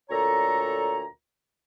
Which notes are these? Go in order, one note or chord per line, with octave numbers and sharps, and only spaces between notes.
D2 A#2 A4 C#5 A#5